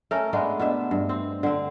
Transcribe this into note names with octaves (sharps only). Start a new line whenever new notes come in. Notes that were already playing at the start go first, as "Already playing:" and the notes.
A3 C#4 A4 A#4
G#3 A3 B3 D4
B2 D4 E5
G2
C4
D3 C4